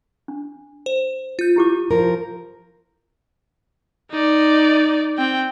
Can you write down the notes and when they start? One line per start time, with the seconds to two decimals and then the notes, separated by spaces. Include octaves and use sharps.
0.28 D4
0.86 C5
1.39 F4 G6
1.56 E4 G4 D6
1.91 F3 A#4
4.11 D#4 D5
5.18 C4 G5